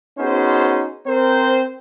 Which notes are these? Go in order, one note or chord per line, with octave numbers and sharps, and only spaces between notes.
B3 C#4 D#4 F#4 G#4 C5
C4 A#4 C5